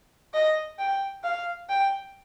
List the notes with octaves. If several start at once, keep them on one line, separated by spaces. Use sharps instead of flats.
D#5
G5
F5
G5